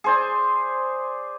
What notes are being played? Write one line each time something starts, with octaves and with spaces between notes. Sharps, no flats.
G#4 C5 D5